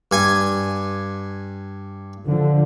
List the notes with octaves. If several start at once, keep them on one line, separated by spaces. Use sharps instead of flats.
G2 G#5
D3 F3